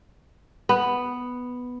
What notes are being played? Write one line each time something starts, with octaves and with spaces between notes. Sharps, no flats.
B3